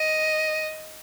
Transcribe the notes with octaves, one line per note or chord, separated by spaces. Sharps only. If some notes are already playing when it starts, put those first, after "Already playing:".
Already playing: D#5